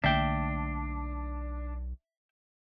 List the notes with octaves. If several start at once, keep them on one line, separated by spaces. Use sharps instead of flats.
B1 D3 A3 A#3 D4 E5 G5